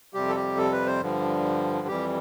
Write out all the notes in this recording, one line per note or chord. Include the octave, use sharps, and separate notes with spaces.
F2 C3 G3 G4
A4
G4
A4
B4
C5
G2 D3 F3
F2 E3 G3 G4